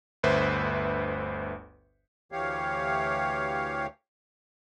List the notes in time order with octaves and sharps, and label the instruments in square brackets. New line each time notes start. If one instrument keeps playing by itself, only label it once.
[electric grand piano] G1 D2 B4 C5 E5
[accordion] D2 E3 G4 C#5 F5